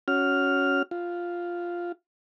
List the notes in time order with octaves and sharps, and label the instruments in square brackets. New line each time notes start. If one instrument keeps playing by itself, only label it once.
[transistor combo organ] C#4 F#4 F6
F4